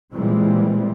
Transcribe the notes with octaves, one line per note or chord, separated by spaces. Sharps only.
A#2 E3 G3 G#3 C4